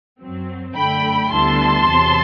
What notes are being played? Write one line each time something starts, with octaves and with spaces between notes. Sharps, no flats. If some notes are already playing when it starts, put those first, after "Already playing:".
F#2 F#3 C4
F#2 D3 A3 G5 B5
D2 D3 G3 B3 E4 A5 C6
E2 C3 F#3